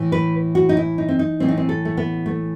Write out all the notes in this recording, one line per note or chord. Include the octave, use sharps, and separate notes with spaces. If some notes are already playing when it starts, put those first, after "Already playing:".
Already playing: A2 E3
B4
F#4
D#4
E4
D#4
C4
D#4
A2 E3 C4
D#4
C4
A4
A3
B3
A3